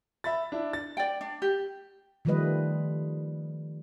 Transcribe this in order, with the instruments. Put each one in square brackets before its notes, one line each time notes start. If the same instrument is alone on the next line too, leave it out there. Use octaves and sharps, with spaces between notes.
[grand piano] E5 B5 A6
D4 E4
A6
[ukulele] D5 G5
D4
G4
[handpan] D#3 F3 G3 A3 B4 D#5